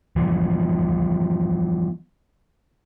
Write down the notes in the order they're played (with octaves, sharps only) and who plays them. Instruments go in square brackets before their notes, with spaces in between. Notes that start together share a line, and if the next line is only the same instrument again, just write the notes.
[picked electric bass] E3 F3 G3 B3